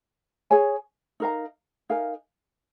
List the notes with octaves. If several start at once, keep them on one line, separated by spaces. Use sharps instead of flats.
G#4 C#5 G#5
D#4 A#4 F5 A#5
D#4 A#4 F5 G#5